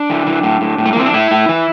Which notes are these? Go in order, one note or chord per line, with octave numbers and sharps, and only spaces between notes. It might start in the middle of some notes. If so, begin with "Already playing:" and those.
Already playing: D4
E3
E3
A2
A2
A2
A3
A#3
E3 C4
D4
A2 E4
A2
E3